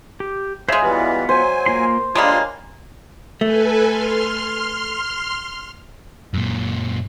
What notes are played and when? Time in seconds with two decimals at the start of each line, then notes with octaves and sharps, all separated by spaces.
0.20 G4
0.69 C#3 G#3 C5 E5
0.82 E3 G3 B3 F4 F#4
1.29 F#3 C5 G#5
1.66 A#3 F4 C6
2.15 G3 G#3 A#3 D4 F4 C#5 G#5 C6
3.41 A3 A4 B4 G#5
3.88 C6 F6
6.34 F#2 A#2